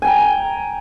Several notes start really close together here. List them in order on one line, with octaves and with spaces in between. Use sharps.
G#5 G5 A#5